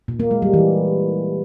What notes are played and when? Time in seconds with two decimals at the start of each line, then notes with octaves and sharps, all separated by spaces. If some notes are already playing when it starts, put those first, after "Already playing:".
0.08 A#2
0.20 A#3
0.31 G#3
0.42 G3
0.54 E3